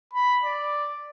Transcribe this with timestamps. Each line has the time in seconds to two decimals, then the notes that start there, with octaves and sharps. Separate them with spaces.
0.14 B5
0.43 D5